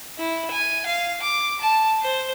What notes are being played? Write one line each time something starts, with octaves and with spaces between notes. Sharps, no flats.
E4
G#5
F5
D6
A5
C5